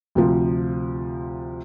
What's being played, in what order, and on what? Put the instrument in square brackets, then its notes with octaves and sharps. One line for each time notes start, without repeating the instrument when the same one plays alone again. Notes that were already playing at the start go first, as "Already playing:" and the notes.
[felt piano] D2 C3 F3